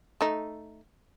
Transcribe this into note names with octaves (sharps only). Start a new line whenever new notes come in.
A3 D#4